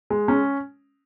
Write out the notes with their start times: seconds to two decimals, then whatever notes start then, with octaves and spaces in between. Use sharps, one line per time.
0.10 G#3
0.28 C#4